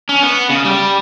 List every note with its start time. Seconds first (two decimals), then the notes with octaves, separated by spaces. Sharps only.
0.09 C#4
0.23 B3
0.49 C#3
0.65 G3